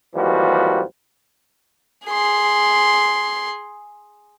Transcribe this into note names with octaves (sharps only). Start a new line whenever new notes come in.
G#1 D#2 E3 F3 G3 F#4
G#4 C6